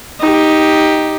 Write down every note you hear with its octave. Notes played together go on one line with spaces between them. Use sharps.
D#4 G4